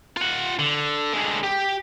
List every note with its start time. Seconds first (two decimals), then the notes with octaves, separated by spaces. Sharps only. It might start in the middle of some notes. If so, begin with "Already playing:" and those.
0.17 F4 F#5
0.59 D3
1.13 D3 G#3
1.43 G4